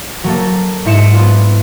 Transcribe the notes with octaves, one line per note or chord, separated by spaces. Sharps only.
F#3 A#3 A4
G#2 E4 C#7 E7
B3 D4 F4